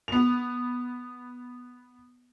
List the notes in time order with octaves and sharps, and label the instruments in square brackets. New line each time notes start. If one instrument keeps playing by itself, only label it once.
[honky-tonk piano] B3 F7